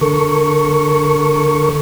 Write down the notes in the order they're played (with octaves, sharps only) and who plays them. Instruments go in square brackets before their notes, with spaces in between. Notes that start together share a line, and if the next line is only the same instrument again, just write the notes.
[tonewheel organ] D3 A4 A#4 C#6